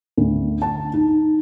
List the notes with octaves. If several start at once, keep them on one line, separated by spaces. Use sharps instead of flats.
D2
A5
D#4